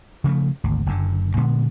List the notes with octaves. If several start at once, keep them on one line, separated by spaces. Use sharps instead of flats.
C#3 F3 G3 A3
G#1 D2
F#1 F#2 D3
A#2 D3 G#3 B3